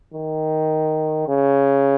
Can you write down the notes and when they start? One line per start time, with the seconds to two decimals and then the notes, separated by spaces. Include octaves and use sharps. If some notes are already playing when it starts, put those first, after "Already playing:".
0.14 D#3
1.28 C#3